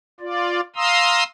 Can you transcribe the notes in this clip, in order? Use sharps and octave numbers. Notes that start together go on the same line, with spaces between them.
F4 D5
F5 A#5 C6 D#6 E6